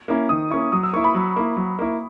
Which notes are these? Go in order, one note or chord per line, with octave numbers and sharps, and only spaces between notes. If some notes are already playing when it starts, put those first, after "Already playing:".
A#3 C#4 E4
D#3 D#6
A#3 C#4 E4 C#6
F#3 D#6
E6
A#3 E4 C#6
B5
F#3
A#3 E4
F#3
A#3 E4